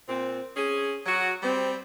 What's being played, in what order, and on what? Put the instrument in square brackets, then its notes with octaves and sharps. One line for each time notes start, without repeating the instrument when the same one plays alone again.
[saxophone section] A#2 C4
C#4 G#4
F#3 F#4
G3 C4